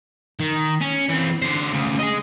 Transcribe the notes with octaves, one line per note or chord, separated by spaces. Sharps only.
D#3
C#4
E3 C4
D3 C5
D2 C#3
G#4 D#5